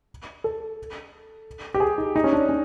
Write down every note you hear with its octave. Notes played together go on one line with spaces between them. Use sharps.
A4
G4
G#4
D#4
D#4
C#4
D4
C#4